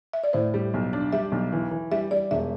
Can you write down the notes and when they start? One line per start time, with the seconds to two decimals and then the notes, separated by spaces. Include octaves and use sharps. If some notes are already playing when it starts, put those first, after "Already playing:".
0.13 E5
0.24 D5
0.33 A2 C5
0.54 G3
0.74 B1
0.93 D4
1.13 G3 E5
1.32 B1
1.52 E3
1.71 E3
1.91 G3 E5
2.11 G3 D5
2.31 E1 E5